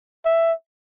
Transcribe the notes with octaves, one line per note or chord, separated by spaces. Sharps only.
E5